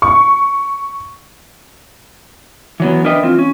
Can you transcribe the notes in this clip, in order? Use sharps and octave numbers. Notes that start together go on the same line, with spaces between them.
C#6
E3 F#3 B3
D4 A#4 B4 D#5 E5 G5
E3 C4 F4
C#4